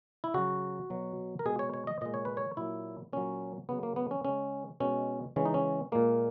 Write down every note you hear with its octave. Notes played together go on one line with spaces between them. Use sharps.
E4
C#3 F#3 F#4
B2 F#3
A#4
B2 G#3 G#4
C#5
C#5
D#5
A#2 G#3 D#5
C#5
B4
C#5
A#2 F#3 E4
A#2 F#3 C#4
C#3 F#3 B3
A#3
B3
C#4
C#3 G#3 C#4
B2 G#3 C#4
C#3 E3 G#3 C#4
D#4
C#4
A#2 G#3 A#3